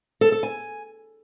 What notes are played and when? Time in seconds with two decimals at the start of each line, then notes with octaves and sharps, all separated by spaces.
0.21 A4
0.32 A4
0.43 G#5